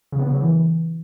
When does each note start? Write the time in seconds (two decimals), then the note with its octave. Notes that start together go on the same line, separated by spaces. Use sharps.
0.12 C#3
0.20 B3
0.27 C#3
0.34 F#3
0.41 E3